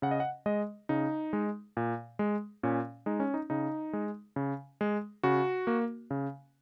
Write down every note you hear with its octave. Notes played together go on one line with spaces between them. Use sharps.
C#3 F#5
D#5
F#5
G#3 D#5
C#3 D#4
G#3
A#2
G#3
A#2 C#4
G#3 D#4
C#4
D#4
C#3 D#4
G#3
C#3
G#3
C#3 F#4
A#3
C#3